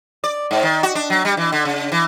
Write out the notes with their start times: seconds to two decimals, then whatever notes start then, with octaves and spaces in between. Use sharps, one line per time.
0.24 D5
0.51 G#2
0.63 D#3
0.83 F#4
0.95 D4
1.10 F#3
1.25 G3
1.37 E3
1.52 D3
1.65 C#3
1.92 E3